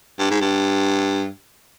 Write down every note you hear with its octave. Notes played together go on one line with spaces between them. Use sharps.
G2
G#2
G2